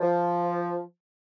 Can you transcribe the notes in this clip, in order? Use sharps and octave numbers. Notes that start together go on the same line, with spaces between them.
F3